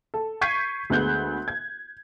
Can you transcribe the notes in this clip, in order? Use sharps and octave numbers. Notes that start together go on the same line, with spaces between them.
A4
C#6 G6 G#6 B6 C7 D#7
D2 G#3 B3 F#6 G6
G#6